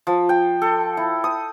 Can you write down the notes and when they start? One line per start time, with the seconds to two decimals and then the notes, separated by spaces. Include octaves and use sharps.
0.07 F3
0.29 G5
0.62 A4
0.97 E4
1.24 D#6